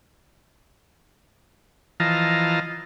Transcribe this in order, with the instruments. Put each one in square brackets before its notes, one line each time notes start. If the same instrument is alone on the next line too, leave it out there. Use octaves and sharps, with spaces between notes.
[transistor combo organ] E3 F3 D#5 F5 A5 A#5